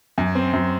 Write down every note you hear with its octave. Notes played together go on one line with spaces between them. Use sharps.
F#2
C4
F#2